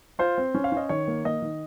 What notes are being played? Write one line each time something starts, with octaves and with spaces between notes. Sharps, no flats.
F4 C5
C4
C#4
F5
C#4 D#5
D#3 C#5
A#3
A#3 D#5
D#3